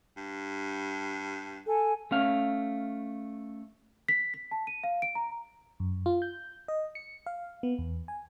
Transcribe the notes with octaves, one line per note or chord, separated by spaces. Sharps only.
G2
A4 G#5
A3 C#4 F5
B6
B6
A5
D#7
F5
D7
A#5
F#2
F4
G6
D#5
C#7
F5
B3
E2
G#5